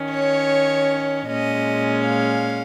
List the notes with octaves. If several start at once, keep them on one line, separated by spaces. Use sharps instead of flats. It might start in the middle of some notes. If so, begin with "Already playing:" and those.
Already playing: D#3 C#4
C#5
A#2 G#3 C#4 D#5
F5